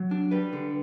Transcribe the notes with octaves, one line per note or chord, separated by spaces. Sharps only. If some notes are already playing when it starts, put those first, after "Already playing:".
Already playing: F#3
D4
G3 B4
D3